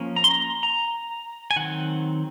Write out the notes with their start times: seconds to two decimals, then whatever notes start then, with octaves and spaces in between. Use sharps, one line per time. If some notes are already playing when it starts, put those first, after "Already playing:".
Already playing: F3 A#3 C#4
0.16 A#5
0.24 C6
0.31 A#5
0.63 A#5
1.51 G#5
1.56 D#3 F#3 C4 F#5